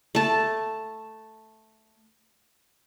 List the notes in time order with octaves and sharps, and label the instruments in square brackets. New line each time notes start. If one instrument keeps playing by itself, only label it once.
[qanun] A3 A5